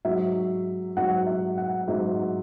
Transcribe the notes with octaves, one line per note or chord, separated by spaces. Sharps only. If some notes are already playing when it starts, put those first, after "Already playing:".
G#2 F#3 E5
G#2 F#3 F#5
E5
F#5
G#2 F#3 E5